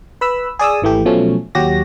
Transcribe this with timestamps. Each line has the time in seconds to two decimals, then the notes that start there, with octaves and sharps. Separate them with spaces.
0.21 B4 B5 E6
0.59 G#4 D5 D#6 E6
0.82 G#1 E3 A3 G4
1.05 B2 F3 F#3 A3 C#4
1.55 D#2 F#3 F#4 G4 A#6